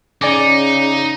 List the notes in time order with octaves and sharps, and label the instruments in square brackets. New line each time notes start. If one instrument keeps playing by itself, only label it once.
[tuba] C#3 [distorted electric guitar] D#4 [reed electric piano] D5 G#5 D6